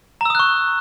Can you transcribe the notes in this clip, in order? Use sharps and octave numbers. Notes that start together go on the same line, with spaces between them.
A#5 C#6 D#6 E6 F#6